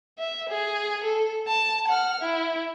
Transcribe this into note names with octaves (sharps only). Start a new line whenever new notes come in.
E5
G#4
A4
A5
F#5 F6
E4